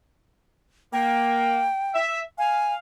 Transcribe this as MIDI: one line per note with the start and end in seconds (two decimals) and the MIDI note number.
0.93 1.65 58
0.93 1.99 79
1.94 2.22 76
2.38 2.78 77
2.38 2.74 80